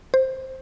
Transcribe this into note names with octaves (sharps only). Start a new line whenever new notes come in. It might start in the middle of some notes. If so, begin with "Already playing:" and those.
C5